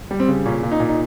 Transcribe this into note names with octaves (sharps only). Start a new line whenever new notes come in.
G3
C4
C#3
A#2 C#4
A#2
D#4
A#2
D#4